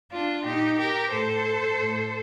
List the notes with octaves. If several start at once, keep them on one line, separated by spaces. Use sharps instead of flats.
D4 F4
A#2 D#4 G4
G4 A#4
A2 A4 C5
A2